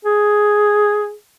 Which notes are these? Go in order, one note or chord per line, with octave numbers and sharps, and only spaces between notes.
G#4